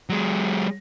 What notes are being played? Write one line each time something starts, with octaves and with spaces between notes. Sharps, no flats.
F#3 G#3